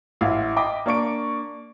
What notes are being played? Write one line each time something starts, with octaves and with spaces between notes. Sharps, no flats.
A1 E4 F5
D#5 G5 B5 D6
A#3 D4 C#6 D7